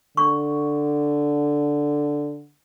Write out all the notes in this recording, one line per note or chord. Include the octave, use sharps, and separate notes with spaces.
D3 C#6